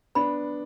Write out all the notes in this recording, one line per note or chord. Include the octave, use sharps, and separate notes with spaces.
B3 D4 B5